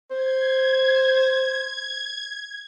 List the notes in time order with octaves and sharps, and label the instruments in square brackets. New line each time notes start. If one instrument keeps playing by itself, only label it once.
[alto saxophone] C5 [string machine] G#6